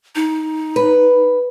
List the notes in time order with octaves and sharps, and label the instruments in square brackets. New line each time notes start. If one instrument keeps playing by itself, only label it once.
[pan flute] D#4
[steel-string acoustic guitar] B4